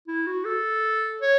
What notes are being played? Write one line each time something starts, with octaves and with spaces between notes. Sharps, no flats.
E4
F#4
A4
C#5